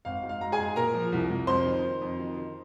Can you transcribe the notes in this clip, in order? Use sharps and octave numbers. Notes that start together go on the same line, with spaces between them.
G#1 F5
G#2
F5
G#2 A#5
G#4 G#5
G#2
A#2 A#4 A#5
F3
C2
C2
F2 C5 C6
D#3
D#3
F2
D#3
D#3